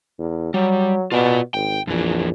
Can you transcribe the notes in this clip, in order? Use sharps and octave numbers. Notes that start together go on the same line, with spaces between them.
E2
F#3 G3
B2 F4 D5
G#1 G5
A#1 F2 E3